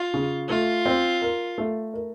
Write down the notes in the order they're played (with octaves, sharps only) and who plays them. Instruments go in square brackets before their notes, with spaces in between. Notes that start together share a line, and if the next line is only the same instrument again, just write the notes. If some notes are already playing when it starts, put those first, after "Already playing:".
Already playing: [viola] F4
[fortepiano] C#3
[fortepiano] A3 [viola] F4
[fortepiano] C4
A#4
A3
A#4